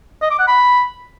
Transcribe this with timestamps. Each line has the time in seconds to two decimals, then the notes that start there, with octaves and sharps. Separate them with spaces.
0.22 D#5
0.30 D6
0.39 F#5
0.48 B5